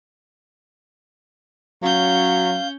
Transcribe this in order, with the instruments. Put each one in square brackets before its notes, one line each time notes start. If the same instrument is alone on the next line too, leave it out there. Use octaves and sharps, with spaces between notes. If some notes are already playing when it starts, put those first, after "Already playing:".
[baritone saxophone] F#3 [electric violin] C#4 G6 [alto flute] F5